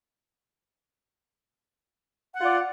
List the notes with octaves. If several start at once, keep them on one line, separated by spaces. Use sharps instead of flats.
F4 D5 F#5